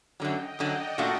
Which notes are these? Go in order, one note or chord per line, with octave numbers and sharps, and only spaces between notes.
F#2 D3 F#3 D#5 G5
F#2 D3 F#3 D5 F#5
A#2 A3 D4 F#4